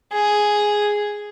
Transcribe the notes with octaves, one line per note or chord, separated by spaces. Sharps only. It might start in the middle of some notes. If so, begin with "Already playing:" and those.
G#4